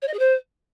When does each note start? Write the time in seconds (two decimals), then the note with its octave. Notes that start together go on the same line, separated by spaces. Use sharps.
0.02 C#5
0.07 D#5
0.13 G#4
0.19 C5